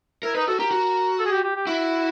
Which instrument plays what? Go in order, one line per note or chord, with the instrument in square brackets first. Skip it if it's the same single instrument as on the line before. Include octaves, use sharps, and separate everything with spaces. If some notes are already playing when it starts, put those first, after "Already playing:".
[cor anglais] E4 [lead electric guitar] A#4
[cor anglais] D#4 [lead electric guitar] B4
[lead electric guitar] F#4 [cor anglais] A4
[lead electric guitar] G4 [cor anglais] A#4
[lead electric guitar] F#4
[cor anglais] A4
G#4
G4
G4
G4
[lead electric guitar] E4 [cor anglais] F#4